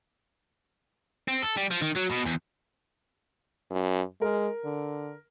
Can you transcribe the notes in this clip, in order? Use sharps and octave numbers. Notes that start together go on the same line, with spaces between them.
C4
A4
G3
F3
D#3
F#3
B2
E2
F#2
G#3 A#4
D3